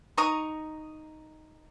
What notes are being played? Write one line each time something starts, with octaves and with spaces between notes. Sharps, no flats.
D#4 A#5 C#6 D#6